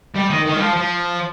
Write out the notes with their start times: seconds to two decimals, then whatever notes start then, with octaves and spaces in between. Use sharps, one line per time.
0.16 G3
0.30 D#3
0.46 D#3
0.57 G3
0.61 F3
0.76 F3